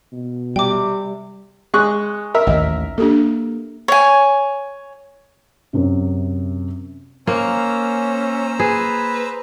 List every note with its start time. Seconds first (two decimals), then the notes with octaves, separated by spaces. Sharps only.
0.13 B2
0.56 C3 G3 G5 D6
1.74 G#3 C#6 F#6
2.34 A#4 E5
2.47 A1 D#2 D#3 D#5
2.98 A#3 D4 G4 A4
3.88 C#5 G#5
5.73 F#2 C3
7.27 A#3 C#4 C5 A#5 E6
8.60 G#4 B4